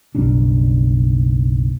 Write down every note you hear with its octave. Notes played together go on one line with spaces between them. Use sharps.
F#1 B1 G3 D4